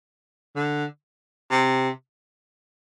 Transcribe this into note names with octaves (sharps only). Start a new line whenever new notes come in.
D3
C3